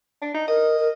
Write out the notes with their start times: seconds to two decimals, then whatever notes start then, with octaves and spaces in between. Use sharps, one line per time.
0.22 D4
0.35 D#4
0.48 A#4 D#5
0.79 A#4